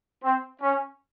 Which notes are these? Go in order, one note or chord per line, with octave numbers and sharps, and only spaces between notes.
C4
C#4